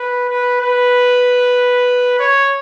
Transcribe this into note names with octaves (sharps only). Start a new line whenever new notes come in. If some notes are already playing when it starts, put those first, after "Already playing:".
Already playing: B4
B4
B4
C#5